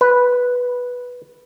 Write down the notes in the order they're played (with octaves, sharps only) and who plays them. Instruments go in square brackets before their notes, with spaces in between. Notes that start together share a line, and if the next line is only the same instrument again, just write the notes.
[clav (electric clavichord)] B4